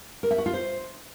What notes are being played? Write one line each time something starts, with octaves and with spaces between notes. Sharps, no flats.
A#4
E5
F#4
F4
C5